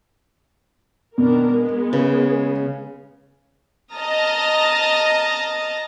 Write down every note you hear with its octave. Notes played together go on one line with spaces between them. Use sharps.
B2 D#3 D4 A#4
G#3 B3
C#3 B4
D#5 A5 A#5 D#6 F6